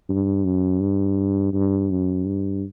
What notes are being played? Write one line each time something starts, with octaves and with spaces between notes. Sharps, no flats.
G2
F#2
G2
G2
F#2
G2